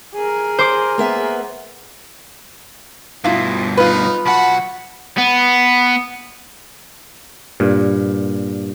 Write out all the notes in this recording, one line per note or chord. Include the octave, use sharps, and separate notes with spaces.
G#4 A#4
C5 D6
A#3 B3 E5
G2 B2 E4 F4
D#4 F4 B4 F5
B1 F#4 F#5 A5 B5
B3
G2 A#2